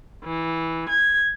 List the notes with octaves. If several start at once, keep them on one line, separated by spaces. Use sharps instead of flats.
E3
G#6